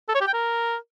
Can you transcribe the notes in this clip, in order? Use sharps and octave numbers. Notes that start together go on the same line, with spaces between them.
A4
C#5
G4
G5
A#4